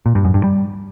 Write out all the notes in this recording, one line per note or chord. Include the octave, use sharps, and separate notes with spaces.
A#2
G2
F#2
G2
G3